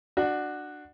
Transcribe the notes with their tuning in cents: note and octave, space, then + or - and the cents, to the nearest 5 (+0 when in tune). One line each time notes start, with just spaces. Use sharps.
D4 +20 F#4 +0